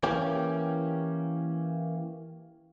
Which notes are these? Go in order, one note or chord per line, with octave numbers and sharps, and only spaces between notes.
E3 A#3 C#4 G4